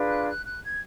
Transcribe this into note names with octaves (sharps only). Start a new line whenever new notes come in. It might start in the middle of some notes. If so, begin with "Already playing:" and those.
Already playing: D4 F4 G#4 B4
F#6
F#6
F#6
G#6